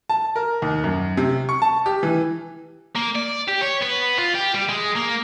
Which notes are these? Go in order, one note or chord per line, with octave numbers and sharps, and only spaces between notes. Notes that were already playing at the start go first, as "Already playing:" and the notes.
A5
A#4
D#2
F#2
C3
C#6
A5
G4
E3
A#3
D5
G4
C#5
B3
F4
G4
G3
G#3
A#3